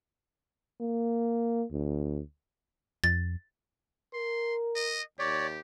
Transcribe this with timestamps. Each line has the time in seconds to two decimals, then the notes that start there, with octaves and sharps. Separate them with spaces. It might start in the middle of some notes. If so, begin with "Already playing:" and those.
0.81 A#3
1.71 D2
3.04 F2 A6
4.13 A#4 C6
4.75 D#5
5.19 D#2 G4 C#5 D5